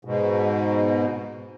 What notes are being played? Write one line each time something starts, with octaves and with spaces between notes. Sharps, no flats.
G#2 B2